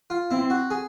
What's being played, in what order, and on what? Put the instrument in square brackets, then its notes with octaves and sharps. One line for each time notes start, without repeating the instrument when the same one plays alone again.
[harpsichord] F4
[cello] C4 [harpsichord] E4
[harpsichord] F#4
G#4